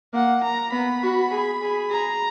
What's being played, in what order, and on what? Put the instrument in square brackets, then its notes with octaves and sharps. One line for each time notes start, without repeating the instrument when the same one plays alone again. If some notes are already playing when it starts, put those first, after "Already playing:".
[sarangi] A#3 [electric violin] F#5
[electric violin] A#5
[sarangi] B3 [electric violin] B5
[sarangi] F#4
G#4
G#4
[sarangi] G#4 [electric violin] A#5